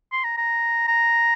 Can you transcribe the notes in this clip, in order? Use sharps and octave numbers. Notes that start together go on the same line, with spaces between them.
C6
A#5
A#5
A#5